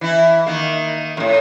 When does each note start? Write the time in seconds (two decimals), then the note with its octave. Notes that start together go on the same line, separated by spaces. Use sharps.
0.01 E3 E4
0.46 D#3 A#3
1.17 E2 A2